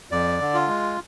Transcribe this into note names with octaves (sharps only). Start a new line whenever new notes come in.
F2 D5
D3
F4
G#3